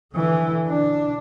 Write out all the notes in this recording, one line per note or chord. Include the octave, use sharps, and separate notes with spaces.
D3 E3
D4